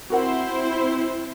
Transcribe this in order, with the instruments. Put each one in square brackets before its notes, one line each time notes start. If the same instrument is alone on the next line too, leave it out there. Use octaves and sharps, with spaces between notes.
[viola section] C4 E4 C5 [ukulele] F#4 A#4 F#5